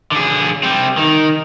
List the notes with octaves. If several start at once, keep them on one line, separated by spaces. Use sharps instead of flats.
D3 G#4
G3 C4
D#3